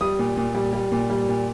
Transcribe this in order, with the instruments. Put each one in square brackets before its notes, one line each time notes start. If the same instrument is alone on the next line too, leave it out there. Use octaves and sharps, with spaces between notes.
[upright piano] G3 D#6
A#2
A#2
G3
G3
A#2
G3
A#2